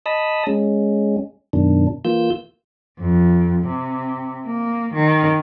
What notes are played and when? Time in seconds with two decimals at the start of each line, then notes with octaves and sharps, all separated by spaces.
0.06 D#5 A5 B5 D#6 E6
0.47 G#3 C#4
1.53 F#2 B2 D#3 D4
2.05 E3 A#3 F4 E6 G6
3.00 F2
3.67 C3
4.46 A#3
4.94 D#3